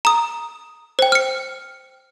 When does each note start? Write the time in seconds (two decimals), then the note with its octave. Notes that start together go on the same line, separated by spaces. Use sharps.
0.05 A#5 D#6
0.99 C5 G5
1.12 F6 C#7